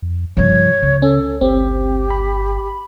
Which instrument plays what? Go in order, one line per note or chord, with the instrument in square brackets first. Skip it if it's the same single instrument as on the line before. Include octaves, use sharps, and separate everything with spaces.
[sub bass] F2
[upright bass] G2 C#3 [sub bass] F3 [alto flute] C#5
[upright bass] C#2 [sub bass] C#3
[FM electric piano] C#4 [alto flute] A4
[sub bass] G1 [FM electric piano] C4 [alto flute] G4
[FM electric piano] B5